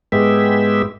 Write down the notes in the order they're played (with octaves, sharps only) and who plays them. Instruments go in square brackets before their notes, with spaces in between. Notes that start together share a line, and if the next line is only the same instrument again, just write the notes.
[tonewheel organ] G#2 G#3 B3 G4 E5